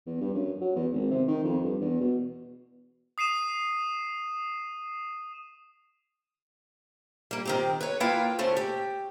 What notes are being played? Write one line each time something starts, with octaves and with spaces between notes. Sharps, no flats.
E2
G2
F#2
F#3
E2
G#1
C3
D#3
F2
G2
E2
B2
D#6 C7 D#7 E7
G3 A#3
D#3 C4 G4
B4 C#5
A#3 E4 F4 B4 F5 G5
D2 A3 C#4 C5
G4